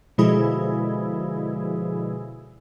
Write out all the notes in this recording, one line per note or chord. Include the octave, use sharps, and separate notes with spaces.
B2 D3 F3 G#3 E4 G#4